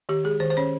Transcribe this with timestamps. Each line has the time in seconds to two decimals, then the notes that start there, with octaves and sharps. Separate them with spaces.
0.09 D#3 G4
0.24 G#3 G#4
0.40 D#3 C5
0.50 C5
0.57 C#4 C#5